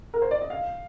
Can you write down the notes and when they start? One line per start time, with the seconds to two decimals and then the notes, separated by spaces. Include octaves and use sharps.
0.14 A#4
0.22 C5
0.31 D5
0.41 D#5
0.50 F5